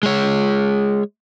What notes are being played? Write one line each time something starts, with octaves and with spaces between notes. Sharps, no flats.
G#3 C#5